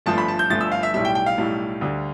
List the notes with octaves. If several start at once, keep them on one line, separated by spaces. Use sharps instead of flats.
G1 G2 F3 A3 A5
B5
A5
G6
G1 G2 F3 A3 A6
E6
F5
E5
B1 A2 G3 E5
G5
G5
F5
B1 A2 G3
D2 D3 G3